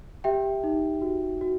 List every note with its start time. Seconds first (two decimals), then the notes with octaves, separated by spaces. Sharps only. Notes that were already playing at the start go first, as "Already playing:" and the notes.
0.24 G4 E5 G5
0.64 D#4
1.01 F#4
1.41 F#4